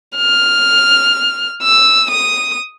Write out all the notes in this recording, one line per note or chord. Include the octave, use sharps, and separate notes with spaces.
F6
E6
D#6